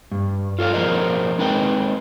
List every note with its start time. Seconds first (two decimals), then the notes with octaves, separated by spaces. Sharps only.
0.12 G2
0.59 F4 A4 C#5 F5
0.74 A2 F3 G#4 A#4 C5 D#5
1.39 G#3 C4 D#4 B4 D#5 G5